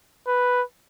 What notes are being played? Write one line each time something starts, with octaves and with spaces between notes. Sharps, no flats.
B4